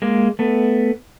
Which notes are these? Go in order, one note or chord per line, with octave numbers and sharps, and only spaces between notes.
G#3 A#3
A3 B3